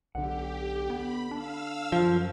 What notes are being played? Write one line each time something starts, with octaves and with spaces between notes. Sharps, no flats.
B1 D3 G4 F#5
B3 B5
D4 F5 E6 F6
F#2 F3